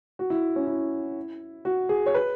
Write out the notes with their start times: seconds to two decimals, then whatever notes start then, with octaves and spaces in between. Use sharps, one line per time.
0.19 F#4
0.30 E4
0.56 C#4
0.67 E4
1.65 F#4
1.89 G#4
2.06 C#5
2.14 B4